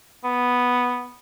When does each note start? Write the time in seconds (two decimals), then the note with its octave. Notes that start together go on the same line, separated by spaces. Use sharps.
0.24 B3